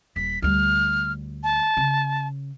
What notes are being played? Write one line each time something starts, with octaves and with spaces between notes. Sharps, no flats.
D#1 B6
D2 G3 F6
A5
C#3